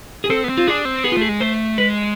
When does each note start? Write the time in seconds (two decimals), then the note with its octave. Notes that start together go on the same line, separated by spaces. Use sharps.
0.24 G#4
0.30 C4 A4
0.44 B3
0.49 C4
0.58 F4
0.67 D4 G#4
0.85 C4
1.04 B3 G#4
1.12 F4
1.17 A3 G#4
1.29 G#3
1.40 A3 C5
1.78 G#3 B4